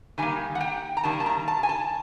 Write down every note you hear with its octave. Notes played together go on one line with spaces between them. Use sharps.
D#3 G3 A#3 G#5
F#5
G5
A#5
D#3 G3 A#3 A5
A5
A#5
A5
G#5
A5